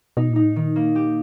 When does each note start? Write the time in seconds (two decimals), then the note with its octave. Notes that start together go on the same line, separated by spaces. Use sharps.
0.17 B2 D#4
0.30 A#2
0.36 D#4
0.43 A2
0.56 A#2 D#3
0.76 A#3
0.96 G4